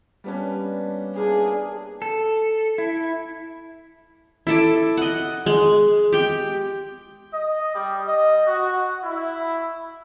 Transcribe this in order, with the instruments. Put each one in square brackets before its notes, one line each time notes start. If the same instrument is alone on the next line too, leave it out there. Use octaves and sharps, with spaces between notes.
[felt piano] G3 B3 C#4 [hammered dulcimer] A#3 D4
[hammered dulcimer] E3 A#3 D4 [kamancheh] G#4
[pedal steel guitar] A4
E4
[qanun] E4 A4 D6
D#5 F#5
G#3
G4 G5
[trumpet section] D#5
G3
D#5
F#4
E4